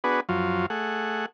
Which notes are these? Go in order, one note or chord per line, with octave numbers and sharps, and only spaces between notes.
B3 D4 F#4 G#4 B4
F#2 F3 F#3 F4
A3 G#4 F#5